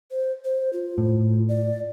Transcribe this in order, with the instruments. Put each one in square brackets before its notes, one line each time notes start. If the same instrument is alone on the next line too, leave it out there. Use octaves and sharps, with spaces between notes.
[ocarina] C5
C5
F4
[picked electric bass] A2
[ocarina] D5